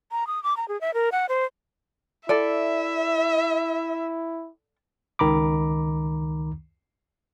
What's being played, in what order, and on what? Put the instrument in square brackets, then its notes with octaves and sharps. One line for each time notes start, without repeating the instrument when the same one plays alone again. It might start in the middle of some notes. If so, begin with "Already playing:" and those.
[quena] A#5
D#6
D6
A#5
G#4
E5
A#4
F#5
C5
[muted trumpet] E4 [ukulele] A4 D5 [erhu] E5
[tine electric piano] C#2 D#3 A#5 B5 D6